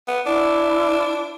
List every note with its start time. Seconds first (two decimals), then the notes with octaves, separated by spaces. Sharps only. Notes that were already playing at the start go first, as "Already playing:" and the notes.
0.08 B3
0.26 D4 E4